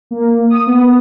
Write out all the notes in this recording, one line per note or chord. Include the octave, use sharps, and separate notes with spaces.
A#3
D#6
B3